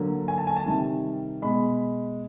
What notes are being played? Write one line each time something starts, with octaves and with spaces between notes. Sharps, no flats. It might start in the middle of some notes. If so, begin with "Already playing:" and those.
Already playing: D3 F#3 A#3
G#5
A5
G#5
A5
C3 D#3 G3
B2 G#3 B5